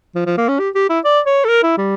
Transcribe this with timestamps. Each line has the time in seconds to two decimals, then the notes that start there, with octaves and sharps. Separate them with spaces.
0.15 F3
0.26 F3
0.38 A#3
0.48 C#4
0.59 G4
0.75 G4
0.89 E4
1.05 D5
1.26 C#5
1.44 A4
1.48 A#4
1.63 E4
1.78 G3